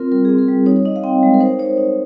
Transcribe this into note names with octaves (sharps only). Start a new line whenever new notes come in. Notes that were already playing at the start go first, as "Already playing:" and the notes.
Already playing: C4 F4 A#4
G3 A#4
C4 G#4
A#4
G3
D#4 C#5
C#5
D#4 D#5
F5
C4 G5
G#3
A#4
D#4 C5
D#4 C#5
D#4